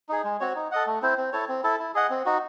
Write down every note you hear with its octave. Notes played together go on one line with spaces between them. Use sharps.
D#4 G#4
G#3
C4 F#4 C#5
D#4
A4 D#5 F#5
A3
C4 E4 C5
C4
E4 A4 C#5
C4
E4 A4
E4
G#4 D#5 F#5
C4
D#4 F#4